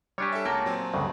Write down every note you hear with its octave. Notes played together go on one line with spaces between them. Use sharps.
G3 D4 G4 C#5 G#5
A4 E5
C#2 A#3 G4 A5 A#5
A#2 F#3 C4
D2 G2 C#3